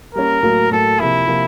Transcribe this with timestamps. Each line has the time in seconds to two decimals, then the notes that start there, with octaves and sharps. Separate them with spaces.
0.14 G3 A#3 C#4 A#4
0.43 A2 F#3 A#3
0.71 A2 F#3 A#3 A4
0.99 C3 F3 A#3 E4
1.28 C3 F3 A#3